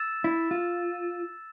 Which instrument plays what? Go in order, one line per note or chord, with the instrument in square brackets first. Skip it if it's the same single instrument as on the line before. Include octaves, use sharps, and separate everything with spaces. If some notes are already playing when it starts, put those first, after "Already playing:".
Already playing: [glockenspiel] E6 A6 E7
[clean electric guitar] E4
F4